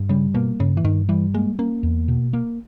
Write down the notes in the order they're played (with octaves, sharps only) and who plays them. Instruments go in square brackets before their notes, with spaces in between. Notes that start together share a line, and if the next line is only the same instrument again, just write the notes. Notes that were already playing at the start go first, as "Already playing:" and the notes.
Already playing: [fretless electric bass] G2
[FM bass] C#3 [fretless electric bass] G3
[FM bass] B2 [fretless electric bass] A#3
[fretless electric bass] G2 [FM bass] C#3
[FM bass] E3
[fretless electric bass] G2 [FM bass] D#3
[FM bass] E3 [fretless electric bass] G3
[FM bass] G#3 [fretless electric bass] A#3
[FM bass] A#3 [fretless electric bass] C#4
[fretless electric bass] E2
B2
A#3